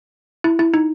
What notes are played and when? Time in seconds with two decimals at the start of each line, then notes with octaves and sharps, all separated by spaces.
0.44 E4
0.59 E4
0.74 D#4